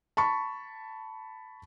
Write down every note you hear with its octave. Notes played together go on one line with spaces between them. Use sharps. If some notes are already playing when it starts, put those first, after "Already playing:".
A5 B5 C#6